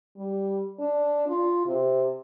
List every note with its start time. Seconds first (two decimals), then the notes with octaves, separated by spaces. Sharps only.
0.17 G3
0.80 D4
1.28 F4
1.67 C3